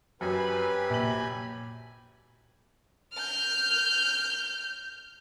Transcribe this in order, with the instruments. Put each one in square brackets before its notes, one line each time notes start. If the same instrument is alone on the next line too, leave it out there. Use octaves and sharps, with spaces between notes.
[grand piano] F#2 [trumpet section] C4 B4 [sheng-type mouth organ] G4 G#5 B5
[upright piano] A#1 F#7
[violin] F6 G6